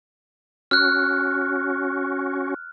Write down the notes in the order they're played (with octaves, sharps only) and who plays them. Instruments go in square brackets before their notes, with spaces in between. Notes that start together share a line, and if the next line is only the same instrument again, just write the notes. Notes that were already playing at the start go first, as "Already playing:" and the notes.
[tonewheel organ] C#4 F#4 [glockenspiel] F6 F#6